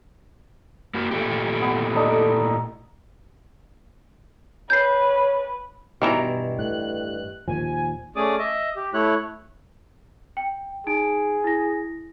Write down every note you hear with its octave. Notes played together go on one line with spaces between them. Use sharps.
A#3 F#4
A#2 A3 G4
B3
D#4 A4 D5
B4 C#5 G6 C7
G2 B2 D#3 E3 A#5
A2 F#6
D#2 A#2 F3 G#5
A3 C#4 G#4 D5 D6 D#6
D#5 E5
G4
A3 E4 C#5 F#6
G5
D#4 G#4 D7
E4 A#6